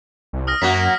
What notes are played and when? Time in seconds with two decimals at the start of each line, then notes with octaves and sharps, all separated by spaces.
0.33 C2
0.47 D#6 F6 A#6
0.62 F#2 F#3 A#3 F#4 B6